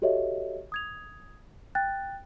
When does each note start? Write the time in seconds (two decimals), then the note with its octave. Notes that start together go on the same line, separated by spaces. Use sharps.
0.02 F#4 G4 A4 C#5 D#5 E5
0.72 D#6 G#6 F7
1.75 G5 F#6 A6